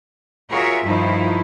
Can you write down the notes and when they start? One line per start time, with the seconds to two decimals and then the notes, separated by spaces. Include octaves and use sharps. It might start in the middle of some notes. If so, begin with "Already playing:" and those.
0.49 F4 F#4 G#4 A#4 C#5 E5
0.84 G2 D#3 F3 D#4 E4